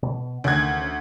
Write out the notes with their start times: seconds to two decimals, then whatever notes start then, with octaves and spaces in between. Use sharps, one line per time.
0.03 B2
0.44 D2 D#3 C#4 G#6